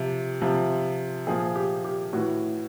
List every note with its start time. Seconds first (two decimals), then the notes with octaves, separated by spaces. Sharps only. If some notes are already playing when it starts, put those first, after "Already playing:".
Already playing: C3 F3
0.42 C3 F3
1.27 A#2 F3 G#4
1.56 G4
1.84 G4
2.13 A2 E3 F#4